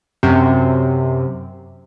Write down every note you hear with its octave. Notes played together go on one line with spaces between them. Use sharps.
F#2 C3